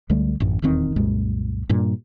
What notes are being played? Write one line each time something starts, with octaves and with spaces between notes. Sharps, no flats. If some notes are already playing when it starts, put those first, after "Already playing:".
C#2 D3 G3 A3
A1 F#2
D#1 E2 D#3 C4
C2 F#2 A#2 G#3
G2 A#2 G3